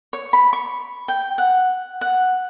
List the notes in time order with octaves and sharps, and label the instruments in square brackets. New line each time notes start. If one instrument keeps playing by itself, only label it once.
[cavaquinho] C#5
B5
C#6
G5
F#5
F#5